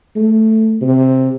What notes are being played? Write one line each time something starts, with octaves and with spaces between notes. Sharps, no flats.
A3
C3